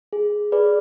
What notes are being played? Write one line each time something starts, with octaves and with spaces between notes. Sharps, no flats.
G#4
G#4 B4 D5